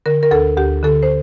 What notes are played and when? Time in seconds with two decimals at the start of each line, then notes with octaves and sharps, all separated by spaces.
0.06 D3 A#4
0.23 A#4
0.31 D2 A4
0.57 D2 G4
0.83 D3 A4
1.03 C5